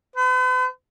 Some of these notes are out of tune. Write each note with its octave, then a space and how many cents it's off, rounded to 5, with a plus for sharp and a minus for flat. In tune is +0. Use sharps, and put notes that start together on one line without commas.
B4 +45